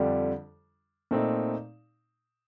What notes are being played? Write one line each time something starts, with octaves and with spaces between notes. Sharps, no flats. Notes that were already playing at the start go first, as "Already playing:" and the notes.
Already playing: F2 D3 G3 D4 F4
A#2 A3 C4 D#4